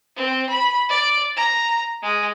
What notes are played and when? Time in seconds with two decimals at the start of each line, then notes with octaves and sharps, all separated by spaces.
0.17 C4
0.49 B5
0.89 D5
1.37 A#5
2.02 G#3